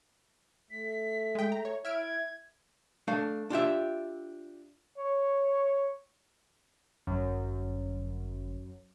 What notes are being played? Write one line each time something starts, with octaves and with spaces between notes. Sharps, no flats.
A3 B6
G#3 G5
A#5
C#5
E4 E5 F6 G#6 D7
A3 D4 F5
D4 F4 G4 E5
C#5
G1 F#2